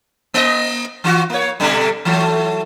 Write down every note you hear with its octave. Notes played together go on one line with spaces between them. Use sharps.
A#3 D#5
E3 F4 F#4
A#3 C#5
B2 D3 G3
E3 F#3 A3